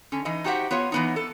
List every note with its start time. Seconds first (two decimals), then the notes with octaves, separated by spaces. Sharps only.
0.12 D3 C#4
0.25 E3 D#4 D#5
0.44 D#4 F#4 G4 C5 E5 F#5
0.71 B3 F4 C#5
0.92 E3 B3 D#4
1.16 A4